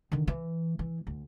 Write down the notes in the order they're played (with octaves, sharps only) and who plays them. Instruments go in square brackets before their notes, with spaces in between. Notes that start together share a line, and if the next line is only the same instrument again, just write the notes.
[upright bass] D3 D#3
E3
E3
D2